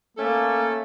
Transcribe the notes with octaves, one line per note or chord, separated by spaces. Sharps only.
A3 A#3 C#4 A4